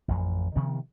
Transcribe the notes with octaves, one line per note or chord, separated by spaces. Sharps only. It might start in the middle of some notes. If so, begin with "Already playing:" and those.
A1 F2
C3 D#3 F3 B3